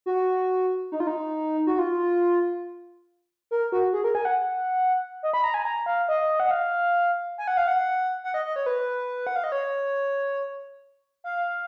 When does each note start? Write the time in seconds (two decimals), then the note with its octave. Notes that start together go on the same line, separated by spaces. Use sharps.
0.06 F#4
0.92 D#4
1.00 F4
1.07 D#4
1.67 F#4
1.79 F4
3.51 A#4
3.72 F#4
3.93 G#4
4.04 A#4
4.15 G#5
4.25 F#5
5.23 D#5
5.33 B5
5.44 A#5
5.54 G#5
5.65 A#5
5.86 F5
6.09 D#5
6.40 F#5
6.51 F5
7.38 G#5
7.48 F#5
7.57 F5
7.68 F#5
8.24 F#5
8.34 D#5
8.45 D#5
8.56 C#5
8.66 B4
9.27 F#5
9.36 F5
9.44 D#5
9.52 C#5
11.24 F5